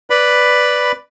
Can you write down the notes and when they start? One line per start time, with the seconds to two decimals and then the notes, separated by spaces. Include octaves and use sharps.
0.10 B4 D5 B5